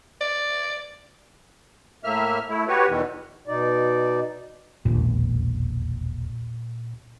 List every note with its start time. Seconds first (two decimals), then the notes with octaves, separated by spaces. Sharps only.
0.21 D5
2.04 A2 A#3 E5 F6
2.49 A3 E4
2.68 F#4 G4 B4 C#5
2.89 E2 B2 D#3 E3
3.47 B2 D#4 D5
4.85 E1 A#1 D#2 A#2